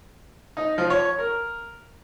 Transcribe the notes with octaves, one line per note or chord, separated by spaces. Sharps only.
D#4
F3
C#5
A#4